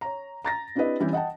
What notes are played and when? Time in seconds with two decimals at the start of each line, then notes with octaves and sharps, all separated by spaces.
0.01 C#5 A#5
0.45 A#5 A6 A#6
0.75 C4 D4 E4 G4 B4 D#5
1.00 E3 G3 C4 C#4 E4 G4
1.13 D#5 F#5 G5 A5